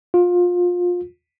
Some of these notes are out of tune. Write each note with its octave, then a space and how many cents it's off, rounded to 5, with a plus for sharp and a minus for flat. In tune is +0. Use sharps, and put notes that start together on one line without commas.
F4 +25